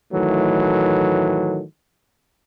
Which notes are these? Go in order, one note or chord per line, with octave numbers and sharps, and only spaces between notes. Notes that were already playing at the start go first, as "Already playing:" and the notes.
A2 D#3 E3 F#3 A3